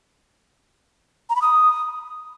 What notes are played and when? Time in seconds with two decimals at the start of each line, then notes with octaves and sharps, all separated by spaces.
1.30 A#5
1.36 B5
1.42 D#6